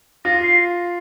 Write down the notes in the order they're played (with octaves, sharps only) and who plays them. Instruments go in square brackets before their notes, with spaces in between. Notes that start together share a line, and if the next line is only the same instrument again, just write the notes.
[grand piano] F4 [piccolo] A#6
[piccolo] C7